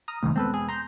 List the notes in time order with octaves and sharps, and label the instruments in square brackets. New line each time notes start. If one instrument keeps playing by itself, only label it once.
[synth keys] A#5 D#6 F6
[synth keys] C2 G#2 [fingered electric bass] F2 D#3 A3
[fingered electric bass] E1 G#3 B3 [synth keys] C4 A4 B4
[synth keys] G#4
A#5 C6 G6